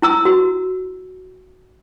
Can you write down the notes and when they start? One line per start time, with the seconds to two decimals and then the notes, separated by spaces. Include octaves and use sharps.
0.02 E4 A#5 E6
0.25 F#4